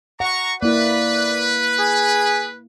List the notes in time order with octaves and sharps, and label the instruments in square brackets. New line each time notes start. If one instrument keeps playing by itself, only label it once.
[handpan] F#5 [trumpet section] A#5 C#6
[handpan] A#3 E4 [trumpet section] B4 [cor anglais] D5
[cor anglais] G#4